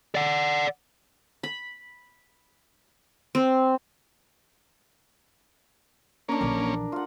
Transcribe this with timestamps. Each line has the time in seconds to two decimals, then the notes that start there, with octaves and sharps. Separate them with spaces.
0.15 D5 F#5
1.43 B5
3.35 C4
6.29 A#3 C#4 D4 A#4
6.41 A#1 E3
6.92 F4 F#5